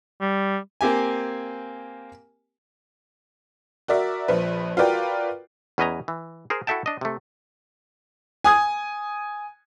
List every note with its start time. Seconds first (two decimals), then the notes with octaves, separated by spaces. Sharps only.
0.21 G3
0.81 A#3 C4 G4 G#5
3.88 F#4 A#4 D5 E5
4.28 A#1 F3 B4
4.77 F4 F#4 A#4 B4 D5 G5
5.78 E2 C#4 B4 D#5 G#5 A#5
6.08 E3
6.50 G#4 A#4 C5
6.67 E4 F#4 A4 E5 G5 A5
6.86 D4 D#5
7.01 C3 A3
8.44 G#5 D#6 G#6